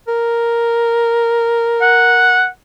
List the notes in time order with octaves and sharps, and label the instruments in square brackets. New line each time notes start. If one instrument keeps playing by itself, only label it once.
[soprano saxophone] A#4
[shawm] F#5